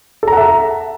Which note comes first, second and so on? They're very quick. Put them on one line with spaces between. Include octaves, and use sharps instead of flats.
A4 A#5 F#5 E5